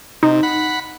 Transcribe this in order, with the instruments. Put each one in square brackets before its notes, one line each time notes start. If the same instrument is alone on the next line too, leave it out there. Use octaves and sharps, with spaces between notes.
[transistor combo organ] C3 [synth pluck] D#4
[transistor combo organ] F#5 B5